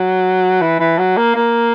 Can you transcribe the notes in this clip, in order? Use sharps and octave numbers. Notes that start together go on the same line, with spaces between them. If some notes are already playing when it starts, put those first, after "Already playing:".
Already playing: F#3
E3
E3
F#3
A#3
A#3